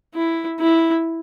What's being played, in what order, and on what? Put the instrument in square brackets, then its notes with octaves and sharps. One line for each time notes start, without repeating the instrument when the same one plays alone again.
[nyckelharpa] E4
E4